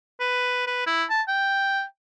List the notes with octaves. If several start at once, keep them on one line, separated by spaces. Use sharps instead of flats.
B4
B4
E4
A5
G5